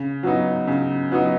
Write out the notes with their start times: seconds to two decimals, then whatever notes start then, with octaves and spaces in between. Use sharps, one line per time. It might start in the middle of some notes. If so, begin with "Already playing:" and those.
Already playing: C#3
0.23 F#3 B3 D#4
0.68 C#3
1.12 F#3 B3 D#4